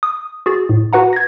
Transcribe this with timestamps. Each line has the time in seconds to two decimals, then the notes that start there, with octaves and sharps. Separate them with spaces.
0.03 D#6
0.46 F#4 G#4 A6
0.69 A2
0.93 F#4 B4 F#5 A#5
1.13 G#6 A#6